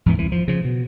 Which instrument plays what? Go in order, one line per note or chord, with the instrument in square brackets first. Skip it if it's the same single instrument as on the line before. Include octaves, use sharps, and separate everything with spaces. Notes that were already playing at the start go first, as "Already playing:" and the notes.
[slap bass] E2 G#2 E3
C2 E3
F3
C#3 F3
B2